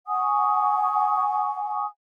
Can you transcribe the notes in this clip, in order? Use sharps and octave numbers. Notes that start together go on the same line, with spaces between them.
F#5 G#5 C#6 D#6